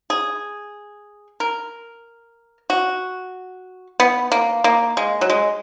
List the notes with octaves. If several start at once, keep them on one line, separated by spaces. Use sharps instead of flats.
G#4
A#4
F#4
B3
A#3
A#3
G#3
F#3
G#3